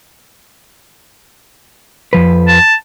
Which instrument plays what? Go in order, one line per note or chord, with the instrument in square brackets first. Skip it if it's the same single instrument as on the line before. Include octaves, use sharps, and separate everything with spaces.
[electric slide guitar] F2 F3 B4
[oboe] A5